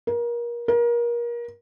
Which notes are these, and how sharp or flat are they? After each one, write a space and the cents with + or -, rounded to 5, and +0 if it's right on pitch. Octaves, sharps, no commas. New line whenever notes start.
A#4 +30
A#4 +30